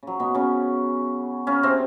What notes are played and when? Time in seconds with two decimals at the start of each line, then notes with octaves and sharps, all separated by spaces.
0.03 C#3 F#3
0.20 B2 B3
0.35 C#3 C#4
1.47 C#3 C#4
1.63 C3 C4